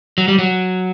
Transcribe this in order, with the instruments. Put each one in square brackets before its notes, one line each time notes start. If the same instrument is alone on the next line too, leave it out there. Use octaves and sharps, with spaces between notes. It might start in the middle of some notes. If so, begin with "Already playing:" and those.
[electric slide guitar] F#3
G3
F#3